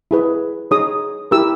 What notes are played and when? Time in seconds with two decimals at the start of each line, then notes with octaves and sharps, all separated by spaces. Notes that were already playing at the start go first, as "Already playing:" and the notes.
0.11 E4 G#4 B4
0.71 D#4 G#4 C#5 D#6
1.31 E4 G4 A#4 E6